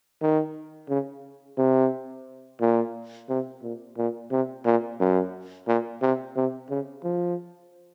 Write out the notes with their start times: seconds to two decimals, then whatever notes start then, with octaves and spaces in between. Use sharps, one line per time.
0.21 D#3
0.89 C#3
1.58 C3
2.61 A#2
3.29 C3
3.62 A#2
3.97 A#2
4.31 C3
4.65 A#2
5.00 F#2
5.68 A#2
6.02 C3
6.36 C3
6.70 C#3
7.04 F3